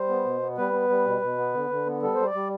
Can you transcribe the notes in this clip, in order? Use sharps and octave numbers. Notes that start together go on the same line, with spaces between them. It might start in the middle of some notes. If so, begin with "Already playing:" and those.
Already playing: G3 C5
B3
B2
B3
G3 B4
B3
G3
B2
B2
B3
D3
D3
B3
G3 A4
G3 C5
D5
G3